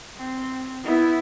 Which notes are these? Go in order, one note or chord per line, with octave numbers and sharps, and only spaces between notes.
C4
B3 E4